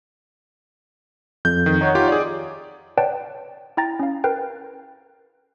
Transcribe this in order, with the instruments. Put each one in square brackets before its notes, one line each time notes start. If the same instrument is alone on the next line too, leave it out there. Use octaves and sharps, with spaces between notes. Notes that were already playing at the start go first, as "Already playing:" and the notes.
[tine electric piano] F2 [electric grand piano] G6
[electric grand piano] D#3
[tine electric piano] D#4 C#5 F#5
[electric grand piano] F4 G4 D6
G#4 D5
[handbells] B4 C#5 D5 F#5 G5 A5
E4 G5 A#5 A6 A#6
C#4 F5
A#4 B4 G5